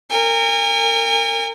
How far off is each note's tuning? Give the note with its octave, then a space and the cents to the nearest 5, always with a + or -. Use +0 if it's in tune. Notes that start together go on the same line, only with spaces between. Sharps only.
A#4 -30 G#5 -45